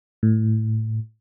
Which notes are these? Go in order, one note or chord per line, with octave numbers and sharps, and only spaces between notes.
A2